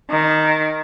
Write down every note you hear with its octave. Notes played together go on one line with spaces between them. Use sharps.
D#3